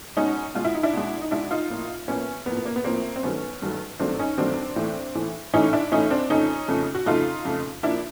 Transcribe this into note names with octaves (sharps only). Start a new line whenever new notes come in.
B2 G#3 C#4 D#4
B2 G#3 F4
E4
D#4
D4 E4
B2 G#3
D#4
B2 G#3 D4 E4
D#4 F4
A2 F3 A#3
A2 F3 A#3 B3 C#4
A2 F3 A#3 B3
B3
A#3
B3
A2 F3 A#3 C4
C4
G2 D#3 F#3 A3 B3 C#4
G2 D#3 F#3 A3
G2 D#3 F#3 A3 C4 D4
C#4 D#4
G2 D#3 F#3 A3 C4 D4
A2 E3 A3
A2 E3 A3
A2 E3 A3 C#4 D#4
D4 E4
A2 E3 A3 C#4 D#4
C4 D4
F2 C#3 F3 A3 C#4 D#4
F2 C#3 F3 A3
F#4
F2 C#3 F3 A3 D#4 F4
F2 C#3 F3 A3
A#2 F3 A#3 D4 E4